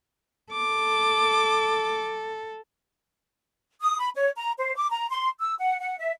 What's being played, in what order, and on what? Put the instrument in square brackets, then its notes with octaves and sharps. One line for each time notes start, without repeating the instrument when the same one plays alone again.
[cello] A4 [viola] D6
[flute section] D#6
B5
C#5
A#5
C5
D6
A#5
C6
E6
F#5
F#5
E5